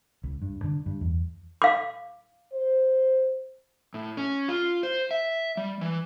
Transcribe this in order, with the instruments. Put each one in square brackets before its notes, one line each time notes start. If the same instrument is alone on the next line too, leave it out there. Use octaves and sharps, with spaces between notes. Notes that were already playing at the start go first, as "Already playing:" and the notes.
[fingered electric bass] C#2
G2
D3
G2
E2
[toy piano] F5 D6
[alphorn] C5
[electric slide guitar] A2
C#4
F4
C5
E5
G3
E3